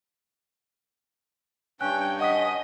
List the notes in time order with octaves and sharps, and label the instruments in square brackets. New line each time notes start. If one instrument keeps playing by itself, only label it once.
[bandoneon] G2 C#4 [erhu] G5 [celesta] F#6
[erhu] D#5 [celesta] F#5 D#6 B6